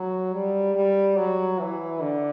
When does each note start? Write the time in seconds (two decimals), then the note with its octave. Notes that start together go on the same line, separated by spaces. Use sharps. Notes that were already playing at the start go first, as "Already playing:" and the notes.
Already playing: F#3
0.33 G3
0.75 G3
1.17 F#3
1.59 E3
2.01 D3